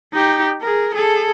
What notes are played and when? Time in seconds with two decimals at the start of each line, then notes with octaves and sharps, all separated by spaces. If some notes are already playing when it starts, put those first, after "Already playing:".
0.13 D#4 G4
0.61 G#4 A#4
0.94 G#4 A4